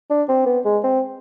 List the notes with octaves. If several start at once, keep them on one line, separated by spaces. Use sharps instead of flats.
D4
C4
B3
G#3
C4